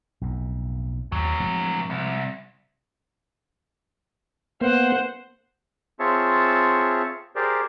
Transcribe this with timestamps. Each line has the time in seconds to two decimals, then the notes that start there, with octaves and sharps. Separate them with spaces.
0.21 B1 F2 A2
1.12 D#2 A2 F#3
1.40 F3 G#3 C4
1.90 C2
4.61 A#3 B3 C5 F#5
6.00 C4 F4 G#4 C#5 E5 A5
7.36 G4 G#4 A#4 C5 D5